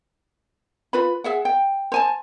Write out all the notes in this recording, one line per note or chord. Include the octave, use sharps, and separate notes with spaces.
F4 B4 B5
G#4 E5 F#5
G5
C5 G#5 A5